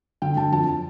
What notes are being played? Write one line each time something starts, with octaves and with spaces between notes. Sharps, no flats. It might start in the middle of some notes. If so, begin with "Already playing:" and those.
D3 G5
D3 A5
F2 A5